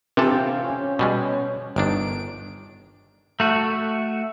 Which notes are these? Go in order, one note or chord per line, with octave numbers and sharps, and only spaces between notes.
C3 E3 C4 F4 G4 A4
C#4
B2 G3 G#3
G1 D#3 D4 D7
A3 F#4